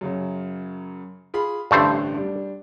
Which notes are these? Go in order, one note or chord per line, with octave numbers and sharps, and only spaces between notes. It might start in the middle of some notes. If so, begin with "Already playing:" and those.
F#2 C#3 F#3
F4 G#4 B5
A1 G2 D3 A3 C5
G3 D4